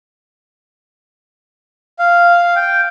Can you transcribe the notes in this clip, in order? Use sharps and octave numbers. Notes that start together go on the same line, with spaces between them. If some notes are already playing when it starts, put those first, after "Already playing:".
F5
G5